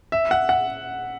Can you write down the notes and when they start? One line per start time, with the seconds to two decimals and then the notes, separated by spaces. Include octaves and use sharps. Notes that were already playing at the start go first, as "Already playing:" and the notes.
0.12 E5
0.31 F#5
0.49 F#5